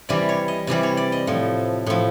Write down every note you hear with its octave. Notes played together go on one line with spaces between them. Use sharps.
C3 E3 G3 D5
C#5
D#5
C3 E3 G3 D5
C#5
D5
D#5
A2 F3
A2 F3